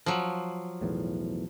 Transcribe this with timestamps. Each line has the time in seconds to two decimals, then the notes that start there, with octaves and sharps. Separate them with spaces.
0.06 F3 F#3
0.81 B1 E2 A2